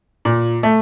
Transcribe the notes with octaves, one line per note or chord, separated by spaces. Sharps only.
A#2
A3